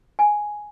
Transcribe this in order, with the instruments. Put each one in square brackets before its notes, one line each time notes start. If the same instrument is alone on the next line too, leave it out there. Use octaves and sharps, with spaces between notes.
[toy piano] G#5